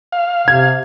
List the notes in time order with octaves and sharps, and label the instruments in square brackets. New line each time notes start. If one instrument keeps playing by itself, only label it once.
[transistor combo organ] F5
[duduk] C3 [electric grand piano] G#6